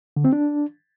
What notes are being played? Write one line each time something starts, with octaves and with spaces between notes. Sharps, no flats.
D3
C4
D4